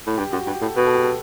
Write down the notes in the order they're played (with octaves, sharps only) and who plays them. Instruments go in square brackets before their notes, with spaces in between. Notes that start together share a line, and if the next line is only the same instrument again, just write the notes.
[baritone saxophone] A2
[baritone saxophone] G2 [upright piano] G4
[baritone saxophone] F#2 [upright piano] F#4
[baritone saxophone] G2 [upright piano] G4
[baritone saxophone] A2 [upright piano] A4
[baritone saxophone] B2 [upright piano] B4
[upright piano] A4
G4
A4